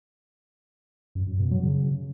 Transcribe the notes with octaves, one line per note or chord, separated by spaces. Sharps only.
F#2
F#2
B2
F#3
C#3